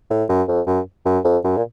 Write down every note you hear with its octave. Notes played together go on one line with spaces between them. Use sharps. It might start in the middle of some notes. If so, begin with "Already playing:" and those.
A2
F#2
F2
F#2
F#2
F2
F#2
A#2